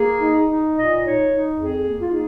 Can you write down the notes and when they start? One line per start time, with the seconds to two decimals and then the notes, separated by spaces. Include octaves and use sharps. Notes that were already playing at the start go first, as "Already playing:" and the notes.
Already playing: A#3 G#4
0.20 D#4
0.48 D#4
0.75 A#2 D#5
1.02 D#4 C#5
1.30 D#4
1.56 F2 G#4
1.84 A#3
1.99 F4
2.11 D#4 G#4